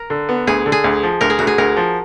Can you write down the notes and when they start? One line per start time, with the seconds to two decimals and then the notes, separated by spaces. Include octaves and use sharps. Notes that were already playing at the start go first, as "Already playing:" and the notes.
Already playing: A#4
0.10 D3
0.29 B3
0.47 D2 G#4
0.66 D3
0.72 G#4
0.84 D2
1.03 F3
1.21 D2 A#4
1.30 G#4
1.39 D2 F#4
1.47 G#4
1.58 D2 A#4
1.77 F3